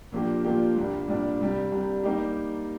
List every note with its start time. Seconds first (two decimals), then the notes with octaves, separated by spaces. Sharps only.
0.12 A#2 F3 A#3 D4 G4
0.44 A#2 F3 A#3 D4 G4
0.76 C2 A#2 G3 D4
1.08 C2 A#2 G3 D4
1.40 C2 C3 G3
1.72 C2 C3 G3
2.04 G3 A#3 D#4 G4